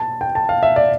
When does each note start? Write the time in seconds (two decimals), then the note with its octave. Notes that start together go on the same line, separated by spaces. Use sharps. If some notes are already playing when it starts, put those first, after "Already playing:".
Already playing: A5
0.21 G5
0.35 A5
0.49 F5
0.63 E5
0.76 D5